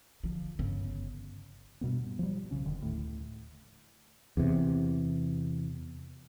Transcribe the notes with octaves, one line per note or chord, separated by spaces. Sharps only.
D3 F3
G1 C#3
G2 B2 B3 C4
G2
F3 G3
B1 C#3 C#4
F1 D3 D#3
D2 A2
E2 C3